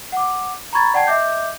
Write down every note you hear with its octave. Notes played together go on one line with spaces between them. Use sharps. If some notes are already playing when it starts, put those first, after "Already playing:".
F#5 D6
A#5 B5 C#6 G#6 A6
D5 F#5 G5 A5 G#6 C7
D#5 E5 D6 G6